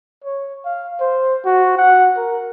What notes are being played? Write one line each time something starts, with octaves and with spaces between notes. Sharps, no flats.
C#5
F5
C5
F#4
F#5
A#4